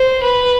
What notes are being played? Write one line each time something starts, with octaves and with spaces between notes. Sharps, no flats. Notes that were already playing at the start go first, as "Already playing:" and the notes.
Already playing: C5
B4